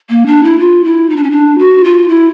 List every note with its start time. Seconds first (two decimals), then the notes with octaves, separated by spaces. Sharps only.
0.10 A#3
0.27 D4
0.44 E4
0.59 F4
0.84 E4
1.10 D#4
1.16 D4
1.23 C#4
1.31 D4
1.59 F#4
1.84 F4
2.08 E4